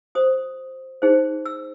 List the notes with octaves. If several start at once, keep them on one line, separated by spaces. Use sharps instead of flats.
F#4 C5 D#6
D#4 G#4 C5
E6